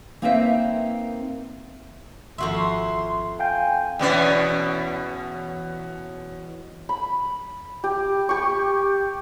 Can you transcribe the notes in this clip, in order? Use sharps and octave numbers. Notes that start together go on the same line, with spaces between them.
A#3 C4 D#4 A#4 B4 E5
G#1 F2 F#4 E5 C6
F5 G5 G#5 G6
E2 B2 C#4
B5
G4
G4 C#6